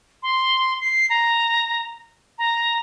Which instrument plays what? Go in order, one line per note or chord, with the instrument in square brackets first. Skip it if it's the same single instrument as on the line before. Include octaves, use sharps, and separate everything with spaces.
[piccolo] C6
C7
A#5
A#5